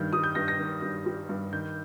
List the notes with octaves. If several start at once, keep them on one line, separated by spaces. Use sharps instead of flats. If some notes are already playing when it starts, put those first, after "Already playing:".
Already playing: G2 D#3 G6
G3 D#6
G6
G2 A#6
A#6
D#3
G2
G3
G2
D#3 G6